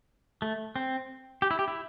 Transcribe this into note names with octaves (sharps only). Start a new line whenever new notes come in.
A3
C4
G4
E4
G4
E4